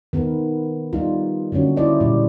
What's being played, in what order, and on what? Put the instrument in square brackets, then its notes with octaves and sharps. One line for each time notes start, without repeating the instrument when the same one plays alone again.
[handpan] D#3 B3 A#4 B4
G3 D#4 F4
D3 F#3 A#3 C#4 F#4
E4 C5 D5 D#5
A#2 G3